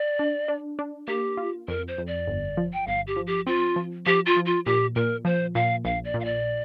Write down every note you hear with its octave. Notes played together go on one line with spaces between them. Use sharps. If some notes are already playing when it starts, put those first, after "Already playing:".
Already playing: D5
D4
D4
D4
A#3 G4
F4
F2 A#4
C5
F2
D5
G1
F3
G5
G1 F5
G4
F3
G4
C4 F4
F3
F3 G4
F4
F3
F4
A#2 G4
A#2 A#4
F3 C5
A#2 F5
A#1 F5
D5
A#2
F5
D5